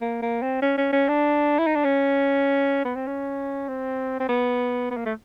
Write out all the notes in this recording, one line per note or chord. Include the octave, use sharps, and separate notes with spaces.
A#3
A#3
C4
C#4
C#4
C#4
D4
E4
D#4
D4
C#4
B3
C4
C#4
C4
C4
B3
B3
A#3
A3